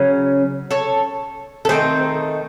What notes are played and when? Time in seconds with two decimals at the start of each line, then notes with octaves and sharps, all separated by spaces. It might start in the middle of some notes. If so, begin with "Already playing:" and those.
Already playing: C#3 F#3 C#4
0.71 A4 C#5
1.65 A4
1.69 D#3 A3 C4 D#4 G#4 C5